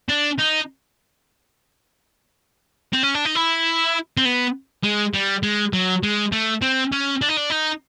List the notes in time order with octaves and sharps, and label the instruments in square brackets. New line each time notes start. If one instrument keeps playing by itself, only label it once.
[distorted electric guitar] D4
D#4
C4
C#4
D4
D#4
E4
C4
B3
G#3
G3
G#3
F#3
G#3
A3
C4
C#4
D4
D#4
D4
D#4